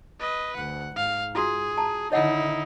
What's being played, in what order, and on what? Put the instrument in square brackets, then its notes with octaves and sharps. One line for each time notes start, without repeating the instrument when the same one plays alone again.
[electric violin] B4 D#5
[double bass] D2 [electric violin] F#5
[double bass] G#2 [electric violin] F5
[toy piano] F4 F#4 [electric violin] G#4
[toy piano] A5 A#5
[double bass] D3 D#3 [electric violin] D#4 E4 [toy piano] C#5 D#5 F#5